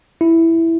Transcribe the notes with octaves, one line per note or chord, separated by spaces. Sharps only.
E4